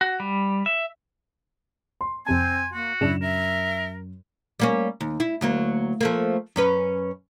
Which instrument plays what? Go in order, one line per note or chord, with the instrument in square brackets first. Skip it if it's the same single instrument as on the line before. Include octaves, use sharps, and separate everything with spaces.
[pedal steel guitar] F#4
G3
E5
[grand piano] C6
[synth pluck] F2 C3 A5 [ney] C4 [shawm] G#5
[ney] A#3 [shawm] F#4
[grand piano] F#2 E7 [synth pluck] C#3 D4 [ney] E4
[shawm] A#4 [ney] E5
[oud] G3 A#3 C#4
D#2
E4
D2 F#3 A#3
F3 A3 A#3
F#2 C#4 B4